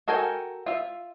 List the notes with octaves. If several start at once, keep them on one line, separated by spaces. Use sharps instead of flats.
F#4 A4 A#4 G5 G#5
F4 E5